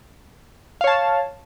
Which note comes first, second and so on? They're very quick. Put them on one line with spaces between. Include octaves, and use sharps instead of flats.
F5 C#5 A5